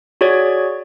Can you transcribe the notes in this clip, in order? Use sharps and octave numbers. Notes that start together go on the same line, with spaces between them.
F#4 G#4 C#5 D5 G#6